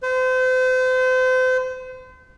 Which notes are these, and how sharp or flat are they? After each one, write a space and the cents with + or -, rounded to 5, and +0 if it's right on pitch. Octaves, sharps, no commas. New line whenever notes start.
C5 -35